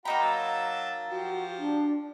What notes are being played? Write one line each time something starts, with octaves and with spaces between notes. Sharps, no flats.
A#3 D#4 F#4 G5 A#5 B5
F#3 A5 E6
F3 F#4 G4
D4